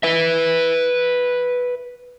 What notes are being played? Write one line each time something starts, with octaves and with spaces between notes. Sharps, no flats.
B4 E5